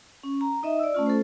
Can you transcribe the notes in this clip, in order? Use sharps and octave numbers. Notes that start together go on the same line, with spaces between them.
C#4
A#5
D#4 D#5 E5
D5 E6
A3 C#4 F4
A4 C5